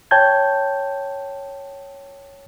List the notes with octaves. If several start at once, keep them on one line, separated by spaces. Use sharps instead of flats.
C#5 G5 A5 G6 G#6